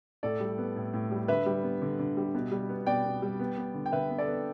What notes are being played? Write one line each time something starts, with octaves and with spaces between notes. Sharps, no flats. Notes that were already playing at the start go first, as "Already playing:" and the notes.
A2 A4 D5
G3
B3
A2
A2
G3
D3 B4 E5
G3
B3
D3
D3
G3
B2
G3
B3
B2 D5 G5
B2
G3
B3
B3
D3
G5
D3 B4 E5
B3
A4 D5
B3